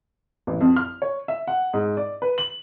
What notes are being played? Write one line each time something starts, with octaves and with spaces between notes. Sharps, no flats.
A1
F2
F6
C#5
E5
F#5
G#2
D5
B4
F#7